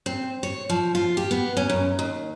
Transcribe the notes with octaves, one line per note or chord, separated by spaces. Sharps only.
C4
C#5
F3
F4
G4
B3
C#4
F#2
D#2